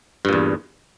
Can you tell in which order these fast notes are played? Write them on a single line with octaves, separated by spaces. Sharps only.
G2 A#2 E2